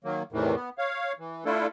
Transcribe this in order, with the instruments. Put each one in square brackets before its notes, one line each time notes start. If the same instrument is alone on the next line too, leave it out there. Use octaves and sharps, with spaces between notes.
[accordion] D#3 F#3 A#3
E2 A2 C3 D#3 E3
B3
C#5 F5
E3
A3 D4 E4 F4 A4